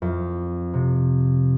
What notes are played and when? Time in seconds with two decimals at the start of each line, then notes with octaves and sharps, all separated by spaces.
0.02 F2
0.74 C3